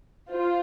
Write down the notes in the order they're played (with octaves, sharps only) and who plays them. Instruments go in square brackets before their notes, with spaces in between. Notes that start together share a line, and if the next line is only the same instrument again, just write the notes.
[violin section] F4 C5